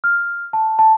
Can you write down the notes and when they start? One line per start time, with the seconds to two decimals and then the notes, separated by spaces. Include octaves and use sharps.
0.04 F6
0.53 A5
0.79 A5